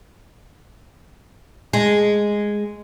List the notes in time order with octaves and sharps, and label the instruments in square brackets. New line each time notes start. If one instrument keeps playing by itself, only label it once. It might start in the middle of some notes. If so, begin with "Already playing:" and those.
[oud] G#3